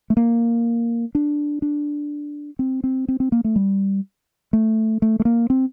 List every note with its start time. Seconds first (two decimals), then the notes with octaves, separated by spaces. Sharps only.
0.10 A3
0.17 A#3
1.15 D4
1.62 D4
2.59 C4
2.84 C4
3.08 C4
3.20 C4
3.32 A#3
3.44 A3
3.56 G3
4.53 A3
5.02 A3
5.20 A3
5.25 A#3
5.50 C4